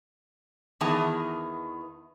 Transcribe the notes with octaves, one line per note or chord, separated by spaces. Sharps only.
E2 D#3 E3 B3 G#4 A5